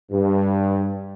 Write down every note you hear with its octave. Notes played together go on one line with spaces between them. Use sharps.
G2